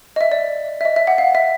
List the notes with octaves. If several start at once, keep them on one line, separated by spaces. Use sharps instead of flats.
D#5
E5
D5
E5
D#5
E5
F#5
F5
E5